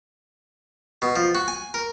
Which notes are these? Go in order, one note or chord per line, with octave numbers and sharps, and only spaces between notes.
B2
F3
F#4
G#5
A#4